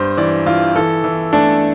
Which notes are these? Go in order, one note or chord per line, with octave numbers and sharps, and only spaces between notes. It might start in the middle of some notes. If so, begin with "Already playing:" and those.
Already playing: G2 C5
E3 D5
E3 F4
E3 A4
E3
A3 D4